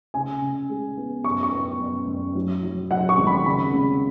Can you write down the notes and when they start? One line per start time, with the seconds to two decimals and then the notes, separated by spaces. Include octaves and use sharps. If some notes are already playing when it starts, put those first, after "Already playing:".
0.14 C#3 G#5
0.42 C#3
0.69 G#3
0.97 B3
1.24 F#2 C#6
1.43 C#6
1.53 B3
1.80 F#2
2.07 F#2
2.35 F#3
2.63 F#3
2.91 F#3 F#5
3.09 C#6
3.18 G#1
3.27 B5
3.46 C#3 B5
3.73 C#3